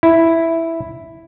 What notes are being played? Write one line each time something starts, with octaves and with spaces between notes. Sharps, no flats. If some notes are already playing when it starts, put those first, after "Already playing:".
E4